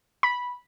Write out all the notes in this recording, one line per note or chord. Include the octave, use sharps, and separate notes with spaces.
B5